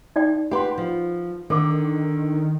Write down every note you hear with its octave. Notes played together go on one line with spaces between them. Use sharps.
D#4 D5 G5
G4 B4 F#5 G5 C6
F3
D3 D#3 A4 A#4 D6